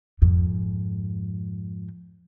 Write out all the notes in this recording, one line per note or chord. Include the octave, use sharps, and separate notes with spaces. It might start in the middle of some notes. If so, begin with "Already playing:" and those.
F2 G#2